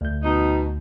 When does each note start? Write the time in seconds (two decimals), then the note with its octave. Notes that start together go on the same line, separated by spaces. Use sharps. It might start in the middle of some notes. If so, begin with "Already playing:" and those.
0.01 D2 G6
0.22 B2 D#4